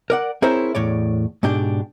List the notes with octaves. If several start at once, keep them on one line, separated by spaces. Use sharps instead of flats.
A#4 D5 F#5
C4 E4 G#4 A#4 C5 C#5
E2 A2 C#5 D5
G#2 B2 D4 G4